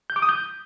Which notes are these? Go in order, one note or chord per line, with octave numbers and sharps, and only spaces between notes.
G6
D6
D#6
G6